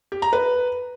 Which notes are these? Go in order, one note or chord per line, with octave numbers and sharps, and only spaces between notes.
G4
A#5
B4